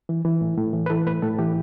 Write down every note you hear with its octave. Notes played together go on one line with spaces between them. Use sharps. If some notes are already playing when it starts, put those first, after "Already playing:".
E3
E3
A2
A2
E3
B4
E3 A4
A2 B4
A2 A4
E3 G4